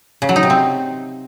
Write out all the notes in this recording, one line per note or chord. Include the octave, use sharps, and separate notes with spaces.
C#3
F#3
D#4
C3
C4